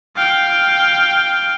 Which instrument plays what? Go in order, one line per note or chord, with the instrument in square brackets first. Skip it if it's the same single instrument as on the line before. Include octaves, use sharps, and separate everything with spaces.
[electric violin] F5 G5